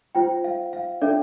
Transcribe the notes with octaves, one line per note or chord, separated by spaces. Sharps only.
F4 C5 G5
F5
F5
D4 A4 D5 E5